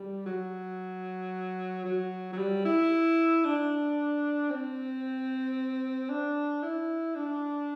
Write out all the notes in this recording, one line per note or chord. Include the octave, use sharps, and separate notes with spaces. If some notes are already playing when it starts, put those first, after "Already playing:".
Already playing: G3
F#3
F#3
F#3
G3
E4
D4
C4
D4
E4
D4